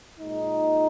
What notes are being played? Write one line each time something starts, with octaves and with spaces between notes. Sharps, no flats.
A#2 G#3 D#4